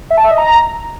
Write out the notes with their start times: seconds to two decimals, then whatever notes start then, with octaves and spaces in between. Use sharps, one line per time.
0.10 E5
0.17 A5
0.24 E5
0.31 D#5
0.38 A#5